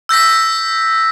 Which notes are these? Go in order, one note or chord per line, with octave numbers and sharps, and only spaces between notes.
E6 G6 A#6 B6